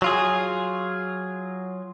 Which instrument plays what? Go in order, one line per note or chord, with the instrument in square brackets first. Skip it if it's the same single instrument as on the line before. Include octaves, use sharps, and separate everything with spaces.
[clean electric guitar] F#3 F4 G#4